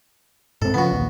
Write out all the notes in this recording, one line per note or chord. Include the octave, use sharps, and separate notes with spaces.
G#2 C4 A4
C#3 F3 B3 F#4
A#1 D#2